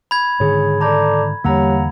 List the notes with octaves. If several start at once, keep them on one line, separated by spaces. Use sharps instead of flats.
B5 G#6
G#2 D3 D#3 G#4 C#5
A4 D5 A5 A#5 D6 G6
E2 D3 G3 A#3 G4 C#5 F#5 A#5